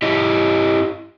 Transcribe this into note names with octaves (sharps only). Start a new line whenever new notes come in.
E4 G4 D#5